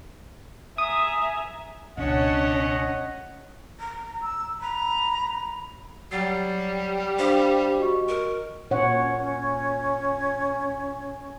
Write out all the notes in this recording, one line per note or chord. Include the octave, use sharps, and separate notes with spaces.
E5 G#5 A#5 D#6
C#2 B2 C#4 D4 C#5 D#5 F#5
A#5
E6
A#5 B5
F#3 G3 F#5 A6 C7
D4 G4 C5 F5
F#4 D#5 C#6
A#4
A#2 C#4 C#5 F#5